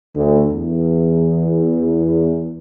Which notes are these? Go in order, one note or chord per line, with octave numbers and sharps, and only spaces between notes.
D2
E2